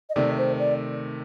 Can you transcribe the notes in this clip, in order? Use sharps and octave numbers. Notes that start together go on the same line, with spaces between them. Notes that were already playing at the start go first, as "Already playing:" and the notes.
D#5
C3 D#3 A3 D5
C5
D5